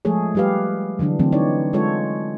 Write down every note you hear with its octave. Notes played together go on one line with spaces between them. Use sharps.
F3 G#3 A3 G#4 A4 C#5
G3 A3 G4 B4 F5
D3 E3 F#3 D4
D3 E3 F#3 A3 C4
D#4 C#5 D5
G#3 F4 A4 C#5